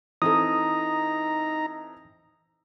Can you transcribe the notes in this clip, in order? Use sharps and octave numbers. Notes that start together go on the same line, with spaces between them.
E3 C4 D#4 A4 A#5 D#6